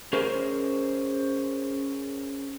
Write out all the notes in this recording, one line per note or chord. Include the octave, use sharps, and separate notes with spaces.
C#4 G#4 A#4 C5